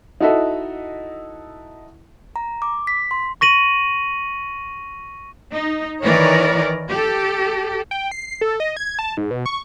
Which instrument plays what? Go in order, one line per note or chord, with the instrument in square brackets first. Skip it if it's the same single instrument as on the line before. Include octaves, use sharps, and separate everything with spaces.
[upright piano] D#4 E4 F#4 A4 D#5 E5
[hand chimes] A#5
D6
B6
C6
[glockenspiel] C#6 A#6 D#7 F#7
[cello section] D#4
D#3 E3 A#4 B4 C#5 D5
G4 A4
[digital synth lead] G5
C7
A4
D#5
G#6
A5
G#2
B2
C#6